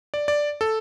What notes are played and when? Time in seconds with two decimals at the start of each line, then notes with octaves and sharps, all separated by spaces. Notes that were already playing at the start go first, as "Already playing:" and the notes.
0.14 D5
0.28 D5
0.61 A4